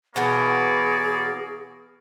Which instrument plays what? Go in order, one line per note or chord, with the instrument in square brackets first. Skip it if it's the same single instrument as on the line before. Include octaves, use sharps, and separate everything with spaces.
[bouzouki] B2 E3 B3 [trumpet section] A#3 C#5 D5 [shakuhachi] G#4